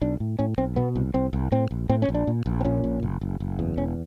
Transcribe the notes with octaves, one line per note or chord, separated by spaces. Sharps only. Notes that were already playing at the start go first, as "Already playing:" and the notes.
B1 D4
A2
A2 C#4
B1 C4
B2 B3
C2
C2 C4
C2
A2 C4
A#1
A2 C4
C#4
A#1
D4
A#2
A#1
C4
A#2 C#4
A#1
F#1
F#1
F#1
E2
E1 C#4